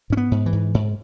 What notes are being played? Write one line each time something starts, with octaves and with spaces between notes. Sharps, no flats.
G#2 C#4
B3
G#2
E3
G#2
G#2